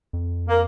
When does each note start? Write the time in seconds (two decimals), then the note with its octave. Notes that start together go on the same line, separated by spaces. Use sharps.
0.13 F2
0.48 A#3